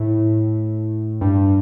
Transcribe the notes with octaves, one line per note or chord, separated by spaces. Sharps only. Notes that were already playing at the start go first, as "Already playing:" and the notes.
Already playing: A2
G2